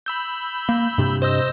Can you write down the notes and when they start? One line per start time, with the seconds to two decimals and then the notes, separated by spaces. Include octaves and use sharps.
0.06 B5 E6 G6
0.69 A#3
0.98 G2 C3
1.22 C5 D#5 E6